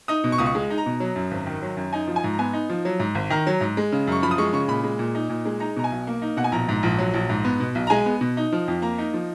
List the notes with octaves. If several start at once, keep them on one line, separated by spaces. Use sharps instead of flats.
D#4 D#6
B2
C#6
C#2 D#6
C#6
G#3
D#4
A#5
B2
F#3
F#2
G#1
D#3
F#3
F#2
D#4 G#5
F3
G#5
G#2
A#5
B3 G#5
D#4
F3
F#3
G#2
G#1
D#3 A#5
F#3
G#2
G#3
C#3
F#2 C#6
F3 B5
D#6
G#3 C#6
C#3 C#6
A#2 B5
G#3
A#2
D#4
A#2
G#3
D#4 A#5
B2 A#5
G#5
B1
A#3
D#4
B2 F#5
G#5
A#1 A#5
G#2
A#1
F#3
A#1
G#2
B3
B2
B1
A#5
G#3 G#5
B3
B2
D#4
F3
F2
A#3 A#5
D#4
F3